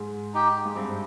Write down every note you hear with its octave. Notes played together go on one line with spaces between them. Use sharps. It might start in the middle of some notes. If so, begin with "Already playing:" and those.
Already playing: G#2
D#4 G4
G#2
G2 C4